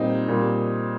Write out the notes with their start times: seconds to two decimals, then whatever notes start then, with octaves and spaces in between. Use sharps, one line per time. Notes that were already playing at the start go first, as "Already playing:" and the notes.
Already playing: A#2 G3 C4 D#4
0.28 A#2 G3